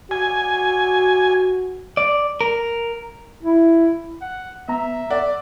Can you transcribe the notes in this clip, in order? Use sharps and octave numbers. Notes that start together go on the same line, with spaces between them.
F#4 G#5
D5
A#4
E4
F#5
B3 E5 A#5
D5 F#5